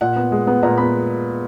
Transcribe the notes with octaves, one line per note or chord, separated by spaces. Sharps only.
A#2 F#5
B3
G#3
B3
A#2 A#5
B3 B5